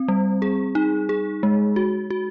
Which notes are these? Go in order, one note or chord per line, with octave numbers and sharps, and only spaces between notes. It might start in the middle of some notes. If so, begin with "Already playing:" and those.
Already playing: C4
G3
G#4
D#4
G#4
G#3
F#4
F#4